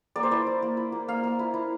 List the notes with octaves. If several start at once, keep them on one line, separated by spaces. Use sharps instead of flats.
A#3 D5
C5
E4 D5
E4
A#3
E4
A#3
A#3 F5
A#3
E4
E4